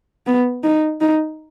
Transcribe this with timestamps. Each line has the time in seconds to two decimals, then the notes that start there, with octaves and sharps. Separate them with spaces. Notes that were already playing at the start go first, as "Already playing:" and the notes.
0.27 B3
0.64 D#4
1.01 D#4